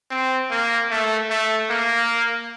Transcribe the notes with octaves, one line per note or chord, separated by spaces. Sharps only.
C4
A#3
A3
A3
A#3